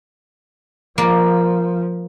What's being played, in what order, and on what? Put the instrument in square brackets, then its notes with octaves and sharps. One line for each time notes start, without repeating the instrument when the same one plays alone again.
[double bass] F3 [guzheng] A#3 D5